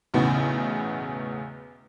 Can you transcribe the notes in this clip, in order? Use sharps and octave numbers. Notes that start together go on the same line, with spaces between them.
B1 E2 A2 C#3 B3